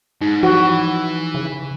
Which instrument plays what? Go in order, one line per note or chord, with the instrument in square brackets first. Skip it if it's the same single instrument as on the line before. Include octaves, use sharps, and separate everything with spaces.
[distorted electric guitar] G#2 [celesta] D#4
[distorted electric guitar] E3 [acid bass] F3 [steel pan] F#4
[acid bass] C#3